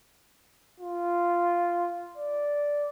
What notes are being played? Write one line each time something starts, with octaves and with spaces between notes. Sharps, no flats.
F4
D5